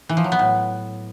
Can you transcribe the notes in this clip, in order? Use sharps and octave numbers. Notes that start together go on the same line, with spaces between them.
E3
F3
F#3
B3
A2